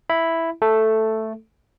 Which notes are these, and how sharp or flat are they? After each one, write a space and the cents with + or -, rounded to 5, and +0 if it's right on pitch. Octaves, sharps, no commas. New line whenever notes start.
E4 +0 B5 +0
A3 +0 A4 +0